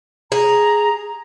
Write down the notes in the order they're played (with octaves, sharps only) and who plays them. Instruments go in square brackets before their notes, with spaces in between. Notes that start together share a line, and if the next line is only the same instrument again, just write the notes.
[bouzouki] G#4 [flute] A#5